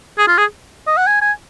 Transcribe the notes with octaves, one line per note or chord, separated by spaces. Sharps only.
G#4
F4
G#4
D#5
F#5
G#5
G#5